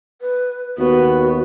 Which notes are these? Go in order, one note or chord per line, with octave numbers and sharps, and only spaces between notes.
B4
D#2 B3 F#4